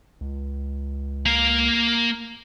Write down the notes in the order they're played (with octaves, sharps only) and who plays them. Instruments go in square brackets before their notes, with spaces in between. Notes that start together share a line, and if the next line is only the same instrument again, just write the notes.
[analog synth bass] C#2
[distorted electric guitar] A#3 F5